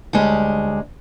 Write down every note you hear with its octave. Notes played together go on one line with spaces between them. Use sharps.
D2 G3 G#3 C#4